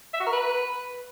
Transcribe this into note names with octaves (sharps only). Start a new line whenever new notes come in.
E5
F#4
A#4
B4